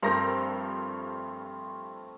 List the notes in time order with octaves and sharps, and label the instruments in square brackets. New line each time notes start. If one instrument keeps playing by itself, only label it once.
[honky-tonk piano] G2 A#4 A#6 [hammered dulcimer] F3 A3 C4